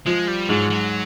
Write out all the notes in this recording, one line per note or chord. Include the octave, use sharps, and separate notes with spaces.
F3 G#3
G3
G#2 F#3
F#3